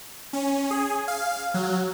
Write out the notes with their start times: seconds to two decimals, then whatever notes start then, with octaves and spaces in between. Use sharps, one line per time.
0.33 C#4
0.71 G#4
1.08 F5
1.54 F#3